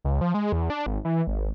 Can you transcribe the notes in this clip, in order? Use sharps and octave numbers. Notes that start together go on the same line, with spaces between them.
C#2
F3
G#3
E2
D4
G#1
E3
G#1